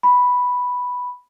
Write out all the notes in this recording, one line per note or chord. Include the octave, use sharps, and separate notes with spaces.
B5